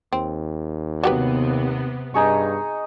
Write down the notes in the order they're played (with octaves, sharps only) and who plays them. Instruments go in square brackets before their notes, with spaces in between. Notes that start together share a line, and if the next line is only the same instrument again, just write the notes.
[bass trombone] D#2 [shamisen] C4
[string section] C3 B3 [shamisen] F#3 G4 B4
[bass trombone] G2 [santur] D#4 G#4 C#6